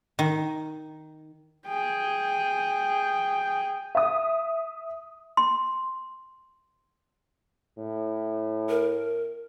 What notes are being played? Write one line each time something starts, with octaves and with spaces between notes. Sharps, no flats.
D#3
G#4 G5
E5 D#6
C6
A2
A#4